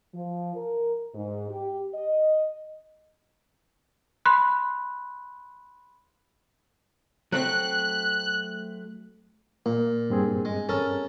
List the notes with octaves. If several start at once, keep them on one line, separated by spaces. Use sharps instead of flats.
F3
A#4
G#2
G4
D#5
B5 C6 F#6
F#3 A3 C4 F#6
A#2 A#3
G2 C4 G#4
G#3
C#4 A4 A#4